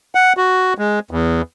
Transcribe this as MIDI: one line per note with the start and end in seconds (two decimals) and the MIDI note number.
0.15 0.33 78
0.37 0.73 66
0.78 0.99 56
1.11 1.42 40